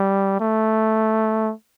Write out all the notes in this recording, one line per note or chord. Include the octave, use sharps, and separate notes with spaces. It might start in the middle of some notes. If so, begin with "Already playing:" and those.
Already playing: G3
A3